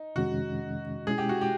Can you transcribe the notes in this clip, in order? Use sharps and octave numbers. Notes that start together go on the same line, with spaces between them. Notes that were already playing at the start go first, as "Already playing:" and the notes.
Already playing: D#4
F2 C3 D#3 G#3 C#4 F#4
B2 G#3 C#4 E4 G#4
G4
F#4
G4